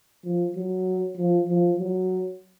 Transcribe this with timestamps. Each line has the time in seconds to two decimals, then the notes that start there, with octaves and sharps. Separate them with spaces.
0.25 F3
0.56 F#3
1.18 F3
1.49 F3
1.79 F#3